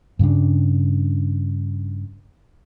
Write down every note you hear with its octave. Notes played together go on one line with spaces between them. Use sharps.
G2 C#3 G3 D4